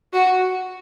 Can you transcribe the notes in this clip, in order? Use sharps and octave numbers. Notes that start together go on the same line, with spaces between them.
F#4